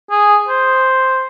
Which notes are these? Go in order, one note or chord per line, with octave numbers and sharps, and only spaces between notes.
G#4
C5